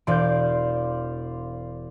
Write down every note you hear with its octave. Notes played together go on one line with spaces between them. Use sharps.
E1 C5 D5 F5 G6